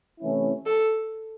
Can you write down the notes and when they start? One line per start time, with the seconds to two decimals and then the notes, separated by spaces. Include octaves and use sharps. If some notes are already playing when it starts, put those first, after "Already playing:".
0.20 C3 E3 A3 C#4 E4
0.66 A4